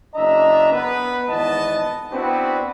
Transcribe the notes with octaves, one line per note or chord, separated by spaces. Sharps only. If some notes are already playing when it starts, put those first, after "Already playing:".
F#1 D4 D#5 E5 A#5
B3 B4
G#1 E2 G#2 B3 D#5 A5
B3 C4 D4 E4 F#4 B4